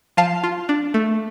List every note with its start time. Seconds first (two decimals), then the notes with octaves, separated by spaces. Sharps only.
0.17 F3 F5 A5
0.43 F4
0.69 D4
0.94 A3